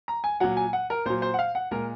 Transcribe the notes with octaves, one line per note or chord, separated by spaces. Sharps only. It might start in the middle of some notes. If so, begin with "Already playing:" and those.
A#5
G#5
A#2 F#3 F#5
G#5
F#5
A#4
A#2 F#3 C5
C5
F#5
F5
F#5
A#2 G#3 A#4